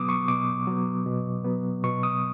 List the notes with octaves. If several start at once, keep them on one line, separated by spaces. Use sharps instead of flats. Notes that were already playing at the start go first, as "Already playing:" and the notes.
Already playing: B2 F#3 B3 D6 D#6
C#6
B2 D6
F#3 B3
B2
F#3 B3
B2 C#6
D#6